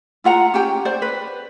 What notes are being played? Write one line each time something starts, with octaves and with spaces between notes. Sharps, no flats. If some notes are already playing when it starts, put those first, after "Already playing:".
E4 F4 F#5 A#5
C#4 G4 G5
C5 D5
B4